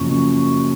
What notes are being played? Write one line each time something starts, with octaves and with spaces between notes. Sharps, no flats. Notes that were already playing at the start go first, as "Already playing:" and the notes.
Already playing: F#1 F#2 C#3 F3 C#6
C#3